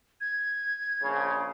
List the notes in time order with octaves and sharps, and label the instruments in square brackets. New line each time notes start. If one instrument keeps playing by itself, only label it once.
[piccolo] G#6
[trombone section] A#1 C#3